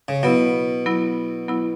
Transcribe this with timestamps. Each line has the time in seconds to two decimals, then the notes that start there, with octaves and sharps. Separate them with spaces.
0.08 C#3
0.23 B2 F#3 B3 E4
0.86 F#3 B3 E4
1.48 F#3 B3 E4